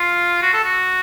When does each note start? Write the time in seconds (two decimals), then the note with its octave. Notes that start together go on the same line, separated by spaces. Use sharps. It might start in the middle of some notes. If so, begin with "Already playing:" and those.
Already playing: F4
0.43 F#4
0.54 A4
0.65 F#4